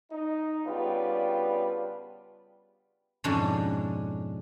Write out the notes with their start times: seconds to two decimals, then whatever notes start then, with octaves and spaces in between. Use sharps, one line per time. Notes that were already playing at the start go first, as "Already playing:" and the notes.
0.11 D#4
0.66 C#3 G3 B3 D4 F4 B4
3.24 F2 G#2 B2 G#3 C#4 D4